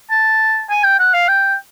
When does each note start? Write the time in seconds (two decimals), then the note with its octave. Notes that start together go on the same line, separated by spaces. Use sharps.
0.11 A5
0.70 G#5
0.84 G5
0.99 F#5
1.14 F5
1.28 G5